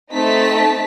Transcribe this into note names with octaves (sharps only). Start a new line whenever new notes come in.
A3 C4 D#4 A5 B6